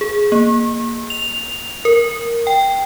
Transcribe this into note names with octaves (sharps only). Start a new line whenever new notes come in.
G#4
A#3
F7
A#4
G5